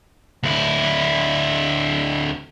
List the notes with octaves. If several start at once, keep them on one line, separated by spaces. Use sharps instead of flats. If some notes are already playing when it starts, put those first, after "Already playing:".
D2 E4